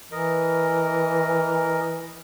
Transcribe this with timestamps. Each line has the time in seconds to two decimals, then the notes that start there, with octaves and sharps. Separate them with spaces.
0.12 E3 A#4 D#5